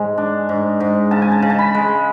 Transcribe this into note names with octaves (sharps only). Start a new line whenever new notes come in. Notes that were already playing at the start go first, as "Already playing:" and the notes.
Already playing: G#2 G#3 G#5
D4
G#2
G#2
C#3 A5
G#5
A5
C#3
A5
B5
G#3